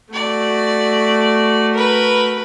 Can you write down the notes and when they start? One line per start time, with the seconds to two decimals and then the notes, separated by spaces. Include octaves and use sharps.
0.13 A3 F#4 D5
1.73 A#4 B4